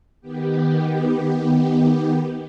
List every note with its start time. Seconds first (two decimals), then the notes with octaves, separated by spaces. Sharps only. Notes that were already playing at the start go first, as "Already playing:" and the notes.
0.21 D#3 B3 G4